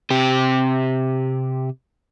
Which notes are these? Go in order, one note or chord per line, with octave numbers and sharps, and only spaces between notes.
C3 G4